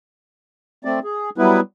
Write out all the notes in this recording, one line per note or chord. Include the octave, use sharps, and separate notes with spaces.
A3 C4 D5
G#4
F#3 G3 B3 E4 B4